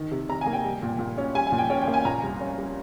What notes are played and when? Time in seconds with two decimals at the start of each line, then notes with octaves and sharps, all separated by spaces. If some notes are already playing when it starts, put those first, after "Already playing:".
Already playing: D#3
0.11 C3
0.29 C3 A#5
0.41 A#3 G#5
0.53 G5
0.64 G3
0.82 A#2
0.99 A#2
1.18 C#4
1.35 G3 G#5
1.47 G#5
1.52 A#2
1.58 G5
1.70 C#4 G5
1.82 G5
1.87 A#3
1.94 G#5
2.05 A#2 A#5
2.23 C2
2.40 C#4
2.58 G3